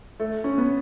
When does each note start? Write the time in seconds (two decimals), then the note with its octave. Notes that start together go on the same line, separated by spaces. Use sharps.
0.20 A3
0.44 C#4
0.58 B3